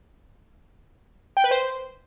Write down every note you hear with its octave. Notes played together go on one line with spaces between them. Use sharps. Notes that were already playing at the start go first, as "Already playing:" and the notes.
G5
B4
C5